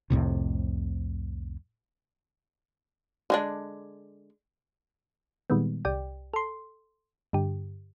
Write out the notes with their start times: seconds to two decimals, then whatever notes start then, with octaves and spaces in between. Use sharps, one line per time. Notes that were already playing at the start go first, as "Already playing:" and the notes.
0.10 C2 F2 A2 C3
3.30 D3 G#3 D4
5.50 A#2 D#3 G3 G#3 B3
5.85 C2 G4 D5 G5
6.34 A4 C6
7.33 G2 D3 G4